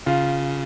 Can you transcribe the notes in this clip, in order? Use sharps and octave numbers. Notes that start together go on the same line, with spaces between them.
C#3 F4